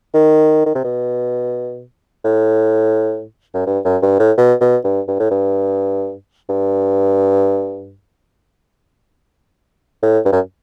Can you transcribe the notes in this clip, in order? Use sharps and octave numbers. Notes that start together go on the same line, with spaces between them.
D#3
D#3
C3
B2
A2
F#2
G2
F#2
G2
A2
B2
B2
G2
G2
A2
G2
G2
A2
G2
F#2